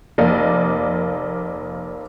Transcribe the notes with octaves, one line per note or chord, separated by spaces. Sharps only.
F1 A#3 D5 D#5